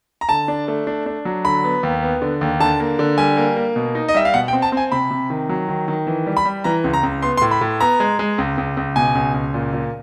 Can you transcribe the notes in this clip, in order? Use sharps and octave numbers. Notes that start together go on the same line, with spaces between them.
A#5
D3 A5
D4
A3
D4
D4
F#3
D3 B5
B3
D#2
B3
D3
D#2
D3 A5
A#3
D3
G3 G#5
A#3
A#3
B2
D#4
D#5
G3 E5
F5
B2 F#5
G5
C4
A5
C4 G#5
C3 B5
C3
D#3
F#3
D#3
D#3
E3
G3
B5
G3
E3 A#5
C#2
A#5
C#2
B3 C6
C6
A2
B5
A2
B3 A#5
G#3
G#3
C#2
C#2
C#2
B2 G#5
C#2
C#2
A#2
A#2